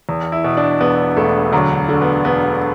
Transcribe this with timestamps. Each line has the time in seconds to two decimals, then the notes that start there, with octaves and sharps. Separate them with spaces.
0.09 E2
0.32 E4
0.44 B2
0.57 D4
0.81 E1 B3
1.17 E1 A3
1.53 D2 F#3
1.89 D3
2.01 B3
2.25 E1 B3